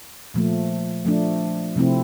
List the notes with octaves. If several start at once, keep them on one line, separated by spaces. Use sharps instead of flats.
A#2 F3 A3
F3 A3 D4
C3 F3 A3 C4 E4